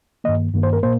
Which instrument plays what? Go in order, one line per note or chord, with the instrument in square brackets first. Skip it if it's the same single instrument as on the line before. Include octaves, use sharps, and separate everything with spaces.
[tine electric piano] G2 D#3 A#3 D#5
G2 D#3 A#3
C5
A#4
A#2 A#3 C5